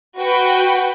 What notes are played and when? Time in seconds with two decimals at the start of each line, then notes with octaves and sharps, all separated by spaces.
0.18 F#4 B4 G5